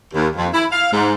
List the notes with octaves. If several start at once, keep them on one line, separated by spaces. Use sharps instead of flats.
D#2
F2
E4
F5
G#2